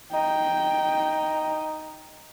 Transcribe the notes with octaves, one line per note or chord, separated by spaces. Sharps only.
D#4 G5